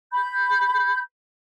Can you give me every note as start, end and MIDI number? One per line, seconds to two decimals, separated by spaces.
0.13 1.01 83
0.13 1.01 91